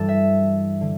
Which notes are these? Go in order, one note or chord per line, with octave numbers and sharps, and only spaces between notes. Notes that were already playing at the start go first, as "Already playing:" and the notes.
Already playing: G2 E3 G3 A4
E5
D3